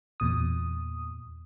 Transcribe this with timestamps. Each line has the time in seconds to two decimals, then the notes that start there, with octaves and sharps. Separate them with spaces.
0.20 E2 A#2 D#6